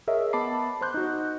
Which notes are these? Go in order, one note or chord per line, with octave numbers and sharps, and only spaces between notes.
G#4 A#4 C#5 D#5 E5
B3 A5 B5 D6 C7
C5 C6 F#6 G6
D#4 F#4